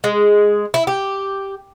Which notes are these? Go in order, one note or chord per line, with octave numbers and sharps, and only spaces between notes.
G#3
E4
G4